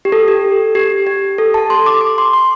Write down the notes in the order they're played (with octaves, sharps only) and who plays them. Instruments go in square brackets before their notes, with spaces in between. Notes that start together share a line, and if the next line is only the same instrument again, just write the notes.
[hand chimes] G4
A4
G4
G4
G4
A4
A5
C6
D6
D6
C6
C6